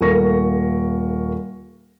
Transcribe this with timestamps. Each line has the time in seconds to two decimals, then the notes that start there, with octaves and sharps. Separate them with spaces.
0.01 D#1 A3 A#3 A#4 C#6 A#6